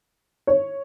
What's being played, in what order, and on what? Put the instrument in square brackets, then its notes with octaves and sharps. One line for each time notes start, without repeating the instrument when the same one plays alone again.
[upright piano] C#5